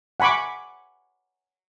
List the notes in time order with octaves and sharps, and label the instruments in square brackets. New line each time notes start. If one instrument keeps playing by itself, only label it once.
[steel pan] F#5 G#5 B5 C#6 D6